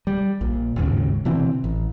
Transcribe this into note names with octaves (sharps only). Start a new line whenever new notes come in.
G3
A#1 A#2
G1 D#2 G#2 C#3
B2 D3 E3 C4
A1